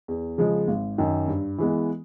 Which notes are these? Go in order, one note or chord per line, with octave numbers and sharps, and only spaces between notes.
E2
C#3 F3 G#3
G#1
F#2 D#3
G2
E3 G#3 B3